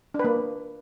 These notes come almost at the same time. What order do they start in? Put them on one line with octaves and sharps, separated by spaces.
D4 B4 A#3